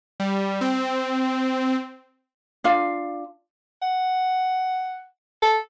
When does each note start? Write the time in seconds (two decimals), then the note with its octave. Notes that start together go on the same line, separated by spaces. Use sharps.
0.20 G3
0.61 C4
2.64 D4 F4 F5
3.82 F#5
5.42 A4